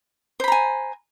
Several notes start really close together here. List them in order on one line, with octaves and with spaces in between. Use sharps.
C5 B5 A#5 G#5